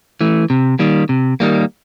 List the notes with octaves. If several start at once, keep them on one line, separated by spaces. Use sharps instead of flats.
E3 A3
C3
D#3 G3 A#3
C3
D#3 G3 A#3